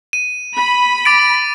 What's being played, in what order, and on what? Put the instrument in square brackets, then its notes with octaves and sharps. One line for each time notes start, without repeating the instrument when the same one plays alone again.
[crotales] D#7
[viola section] B5
[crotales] D6 A6 D7